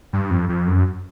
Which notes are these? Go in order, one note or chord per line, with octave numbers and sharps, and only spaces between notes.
G2
F2
F2
F#2